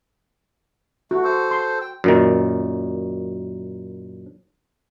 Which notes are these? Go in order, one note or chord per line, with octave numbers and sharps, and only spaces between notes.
A3 F#4
A4 C5
C6
G5
F#2 A#2 D#3